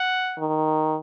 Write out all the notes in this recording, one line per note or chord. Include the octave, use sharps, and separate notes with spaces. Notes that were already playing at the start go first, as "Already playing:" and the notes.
Already playing: F#5
D#3